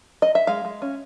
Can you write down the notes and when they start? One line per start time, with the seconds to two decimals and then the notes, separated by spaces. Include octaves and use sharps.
0.22 D#5
0.35 E5
0.47 G#3 F5
0.65 G#3
0.82 C#4